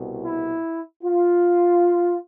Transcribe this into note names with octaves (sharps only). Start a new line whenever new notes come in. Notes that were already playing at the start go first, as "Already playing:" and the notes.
Already playing: C2 B2
E4
F4